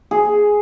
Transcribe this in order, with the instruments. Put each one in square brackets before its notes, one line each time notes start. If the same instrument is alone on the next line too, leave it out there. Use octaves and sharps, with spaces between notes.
[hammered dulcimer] G#4